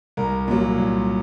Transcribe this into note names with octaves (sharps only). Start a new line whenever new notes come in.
C2 A#4
A#2 F#3
C2